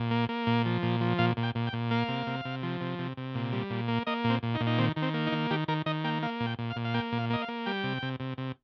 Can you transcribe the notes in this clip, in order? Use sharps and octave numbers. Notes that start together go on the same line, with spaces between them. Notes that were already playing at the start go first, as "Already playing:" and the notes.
Already playing: A#2
A#3
A#3
A#2
F3
A#2
F3
A#2 F5
A#2
G5
A#2
G5
A#2
A#3 F5
C3
C3
C3
F3
C3
C3
C3
A#2
G3
A#2
A#3
A#3 D#5
A#2
C4
A#2
D#4
A#2
D#4
D#3 C4
D#3
C4
A#3
D#4
D#3
D#3 G4
D#3 A#4
D#3 D#5
A#3 G5
A#3 F5
A#2
G5
A#2
F5
A#2
F5
A#3 G5
A#2
F5
A#3 D#5
F5
A#3
G3 G5
C3
C3
C3
C3